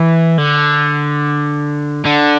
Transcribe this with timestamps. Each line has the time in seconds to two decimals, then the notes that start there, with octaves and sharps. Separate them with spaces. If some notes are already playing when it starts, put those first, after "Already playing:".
Already playing: E3
0.38 D3
2.06 D3